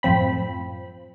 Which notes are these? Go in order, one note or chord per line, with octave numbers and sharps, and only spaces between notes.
F#2 A2 F3 C4 B5